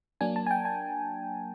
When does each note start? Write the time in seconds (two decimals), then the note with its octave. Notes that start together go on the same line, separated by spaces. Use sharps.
0.21 F#3 A#3 D4 G#5
0.36 A5
0.46 G#5
0.51 G5
0.65 G#5